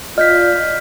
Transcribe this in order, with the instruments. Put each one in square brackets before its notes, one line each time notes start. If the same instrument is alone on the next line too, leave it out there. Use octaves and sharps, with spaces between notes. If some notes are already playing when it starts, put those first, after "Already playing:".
[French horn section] F4 D5 [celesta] D#5 [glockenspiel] F6 G6 B6